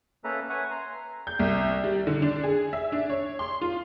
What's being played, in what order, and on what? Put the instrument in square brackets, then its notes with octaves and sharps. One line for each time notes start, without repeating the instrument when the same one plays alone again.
[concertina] A#3 C#4 A4 B4 E5 A#5
B4 C#5 E5 F#5 G#5
A#5 C6
[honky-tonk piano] G6
C2
G3
D3
D4
G#4
E5
D4
C#5
C6
F4